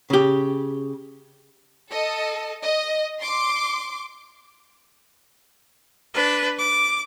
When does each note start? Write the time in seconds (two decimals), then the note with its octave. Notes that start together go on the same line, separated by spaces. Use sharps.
0.10 C#3 G4
1.90 A4 D#5
2.64 D#5
3.20 C6 D6
6.14 D4 B4
6.58 D6